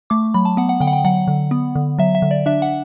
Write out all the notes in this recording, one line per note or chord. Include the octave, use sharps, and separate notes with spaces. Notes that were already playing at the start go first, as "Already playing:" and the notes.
A3 D6
F#3 B5
A5
B3 F#5
F#5
D3 G5
F#5
G5
F#3 F#5
D3
B3
D3
F#3 E5
E5
D3
D5
D4 E5
F#5